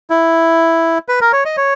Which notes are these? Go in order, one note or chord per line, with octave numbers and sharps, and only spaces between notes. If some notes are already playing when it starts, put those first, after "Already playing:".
E4
B4
A#4
C#5
D#5
C#5